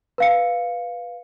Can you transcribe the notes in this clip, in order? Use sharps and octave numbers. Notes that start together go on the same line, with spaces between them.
B4 F5 C#7